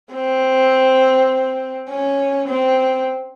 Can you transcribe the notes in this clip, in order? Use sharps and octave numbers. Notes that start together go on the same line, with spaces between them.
C4
C#4
C4